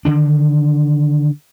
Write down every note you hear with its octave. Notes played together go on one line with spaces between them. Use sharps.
D3 D#3 D4